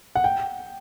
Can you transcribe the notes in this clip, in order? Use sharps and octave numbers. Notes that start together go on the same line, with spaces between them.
F#5
G5